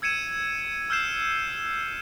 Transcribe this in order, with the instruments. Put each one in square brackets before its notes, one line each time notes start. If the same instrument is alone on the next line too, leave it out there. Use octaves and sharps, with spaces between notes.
[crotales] E6 G#6 C#7 D#7 E7
E6 F6 G6 C7 E7